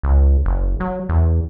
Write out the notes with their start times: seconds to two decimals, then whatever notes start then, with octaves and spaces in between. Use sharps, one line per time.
0.03 C#2
0.45 F#1
0.80 F#3
1.09 E2